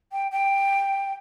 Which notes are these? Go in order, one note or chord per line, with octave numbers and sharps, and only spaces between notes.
G5
G5